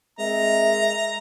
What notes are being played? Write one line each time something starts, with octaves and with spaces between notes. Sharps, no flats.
G#3 C4 A#4 D#5 E5 A#5